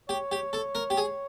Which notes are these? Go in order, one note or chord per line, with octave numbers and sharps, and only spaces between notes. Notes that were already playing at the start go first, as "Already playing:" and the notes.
G4 C#5
G4
A4
A#4
G4
G#4